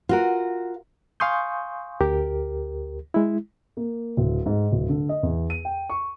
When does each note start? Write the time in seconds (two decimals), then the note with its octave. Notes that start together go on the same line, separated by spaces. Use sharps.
0.09 F4 F#4 A#4
1.20 F5 G#5 C6 C#6 D#6 G6
2.01 D2 G4 A#4
3.14 G#3 E4
3.77 A#3
4.17 D1
4.46 G#2
4.72 D1
4.89 D3
5.09 D#5
5.23 E2
5.50 D#7
5.65 G5
5.90 C#6